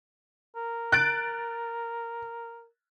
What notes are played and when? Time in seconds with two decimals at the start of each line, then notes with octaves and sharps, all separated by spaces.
0.56 A#4
0.92 F#6 A6 D7